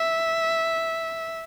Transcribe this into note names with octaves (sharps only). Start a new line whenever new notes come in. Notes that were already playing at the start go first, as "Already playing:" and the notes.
Already playing: E5